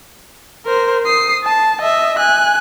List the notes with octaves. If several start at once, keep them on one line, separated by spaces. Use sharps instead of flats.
A#4 C5
D#6 C7
A5
D#5 E5
G#5 F#6